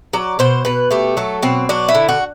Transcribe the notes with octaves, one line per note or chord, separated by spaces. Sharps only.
F#3 D5
B2 C5
B2 B4
A3 G4
F#3 A4
B2 C4
F#3 D4
E4
D3
F#4